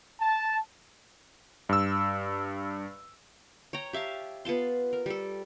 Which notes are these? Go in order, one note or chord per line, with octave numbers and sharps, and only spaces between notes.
A5
G2 E6
C#5 G5 A#5
G4 E5 F5 A5
B3 F4 A5 C6
A#4
G3 A4